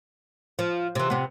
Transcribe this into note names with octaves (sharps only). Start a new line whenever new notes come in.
F3
C3 E3
C3 B3